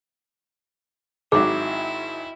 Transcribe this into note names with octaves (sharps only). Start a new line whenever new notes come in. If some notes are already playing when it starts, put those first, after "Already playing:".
G#1 G#2 F#3 E4 G#4